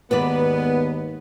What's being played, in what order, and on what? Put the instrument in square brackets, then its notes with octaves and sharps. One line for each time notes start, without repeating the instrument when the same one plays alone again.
[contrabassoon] D#2 [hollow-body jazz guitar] G#2 D#3 [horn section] B3 [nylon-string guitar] B4 D5